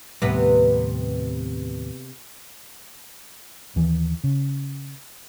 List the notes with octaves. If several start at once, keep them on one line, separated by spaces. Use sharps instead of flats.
D#2 A2 C3 G3 B3 B4
D#2 E3
C#3